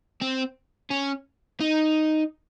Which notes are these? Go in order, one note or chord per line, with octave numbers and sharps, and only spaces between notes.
C4
C#4
D#4